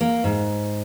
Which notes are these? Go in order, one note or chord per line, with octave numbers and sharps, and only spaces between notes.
A#3
G#2